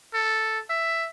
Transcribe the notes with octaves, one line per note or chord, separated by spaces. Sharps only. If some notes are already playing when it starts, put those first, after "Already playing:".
A4
E5